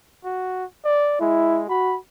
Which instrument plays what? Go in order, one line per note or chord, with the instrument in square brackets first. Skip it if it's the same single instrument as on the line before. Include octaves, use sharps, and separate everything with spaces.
[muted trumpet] F#4
D5
[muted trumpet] G#3 [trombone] E4
[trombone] F#4 [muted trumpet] B5